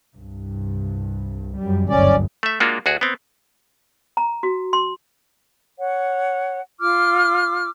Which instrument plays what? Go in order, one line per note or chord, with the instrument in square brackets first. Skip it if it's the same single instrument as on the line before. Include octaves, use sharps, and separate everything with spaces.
[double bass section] C2 G2
F#2 G3
[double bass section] F#1 D2 G2 [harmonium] C#4 D5
[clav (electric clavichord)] A3 E5
G#3 A#3 D4 F4 F#4
D2 F#4 G#4
B3 C4
[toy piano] A#5
F#4
C6
[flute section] C#5 F#5
F4 D6 F6